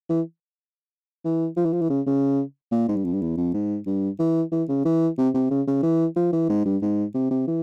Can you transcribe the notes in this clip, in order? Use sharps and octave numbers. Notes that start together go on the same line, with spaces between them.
E3
E3
F3
E3
F3
E3
C#3
C#3
A#2
G#2
G2
F2
G2
E2
F2
G#2
G2
E3
E3
C#3
E3
C3
C3
C#3
C#3
E3
F3
E3
G#2
G2
G#2
C3
C3
E3